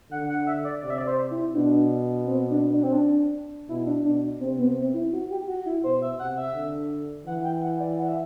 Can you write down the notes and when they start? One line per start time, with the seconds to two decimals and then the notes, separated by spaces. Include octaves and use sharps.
0.11 D3 F#5
0.29 F#5
0.47 E5
0.64 D5
0.82 C3 D5
0.90 E5
0.98 D5
1.07 C5
1.31 E4
1.54 B2 D4
2.26 C4
2.50 D4
2.74 D4
2.83 C4
2.93 D4
3.69 B2 E4
3.86 D4
4.05 B2 D4
4.41 C3 C4
4.58 B3
4.76 C4
4.94 E4
5.13 F#4
5.31 G4
5.48 F#4
5.66 E4
5.83 B2 C5
6.02 E5
6.19 C3 F#5
6.37 E5
6.55 D3
7.27 E3 F#5
7.44 G5
7.63 F#5
7.80 D5
7.99 F#5
8.09 E5